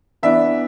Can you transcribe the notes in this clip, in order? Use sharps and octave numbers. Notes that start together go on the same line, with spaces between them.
E3 B3 D4 E5